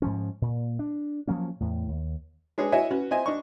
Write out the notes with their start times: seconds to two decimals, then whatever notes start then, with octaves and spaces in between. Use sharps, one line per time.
0.02 G#2 F3 C#4
0.42 A#2
0.79 D4
1.28 F3 F#3 A#3 C#4
1.60 E2 A2
1.89 D#2
2.58 G#3 D4 G#4 B4 C#5
2.72 E4 F#4 C#5 D#5 E5 G#5
2.91 C#4 F#4 B4
3.11 C4 D#5 E5 G#5
3.26 D4 D#5 C#6